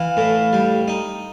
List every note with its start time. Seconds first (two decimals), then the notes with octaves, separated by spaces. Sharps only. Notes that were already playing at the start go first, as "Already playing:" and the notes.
Already playing: E3 F5
0.17 A2
0.53 G3
0.88 D#4